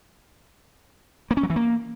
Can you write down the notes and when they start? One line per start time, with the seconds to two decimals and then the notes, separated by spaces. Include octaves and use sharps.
1.31 A#3
1.37 C#4
1.43 F#3
1.50 E3
1.56 A#3